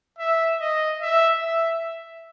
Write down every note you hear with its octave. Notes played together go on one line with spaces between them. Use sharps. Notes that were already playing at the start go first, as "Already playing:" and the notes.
E5
D#5
E5
E5